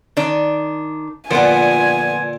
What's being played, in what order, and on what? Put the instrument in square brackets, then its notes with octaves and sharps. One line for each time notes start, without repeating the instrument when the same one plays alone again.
[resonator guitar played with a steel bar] D#3 D4
[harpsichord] A#2 D3 [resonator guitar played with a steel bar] F3 B3 [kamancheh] G#5